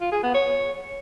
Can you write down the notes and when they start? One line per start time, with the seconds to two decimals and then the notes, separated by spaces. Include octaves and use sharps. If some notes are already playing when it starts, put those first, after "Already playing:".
0.01 F4
0.12 G#4
0.23 B3
0.34 C#5